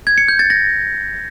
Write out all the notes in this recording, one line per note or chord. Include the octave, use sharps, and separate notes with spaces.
G#6
C#7
G6
A6
A#6